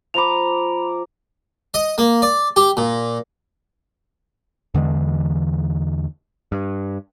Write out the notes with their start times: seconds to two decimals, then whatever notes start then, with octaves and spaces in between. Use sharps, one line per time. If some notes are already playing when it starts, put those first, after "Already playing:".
0.14 F3 A#5 B5 D6 F7
1.74 D#5
1.98 A#3
2.22 D5
2.56 G4
2.77 A#2
4.74 E2 D3 E3 G#3
6.52 G2